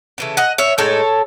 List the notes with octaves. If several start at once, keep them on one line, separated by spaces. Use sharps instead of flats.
C#3 E3 A3
D#5 F#5
C#5 E5
A2 G#3 D#4 A4 C#5